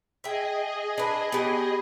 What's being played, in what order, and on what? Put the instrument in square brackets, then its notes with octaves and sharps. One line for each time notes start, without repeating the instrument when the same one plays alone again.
[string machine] G#4 D#5 [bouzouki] E5 G5
[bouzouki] D4 B4
B3 G4 C#5